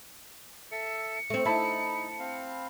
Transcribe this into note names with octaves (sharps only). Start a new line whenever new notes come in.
A4 E5 C#7
A3 C4
D#4 E4 A5 B5
C4 F5